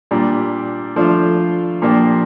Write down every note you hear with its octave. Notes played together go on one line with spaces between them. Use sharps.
A#2 G3 D4
F3 A3 D4 F4
A#2 F3 A#3 D4 G4